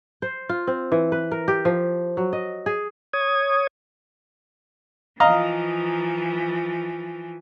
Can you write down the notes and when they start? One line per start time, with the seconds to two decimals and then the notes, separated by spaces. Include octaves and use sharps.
0.22 C5
0.49 F4
0.67 C4
0.92 E3
1.12 B4
1.31 A#4
1.48 G4
1.65 F3
2.17 F#3
2.33 D#5
2.66 G#4
3.13 C#5 D#6 G#6
5.20 E3 F3 D#5 F5 A#5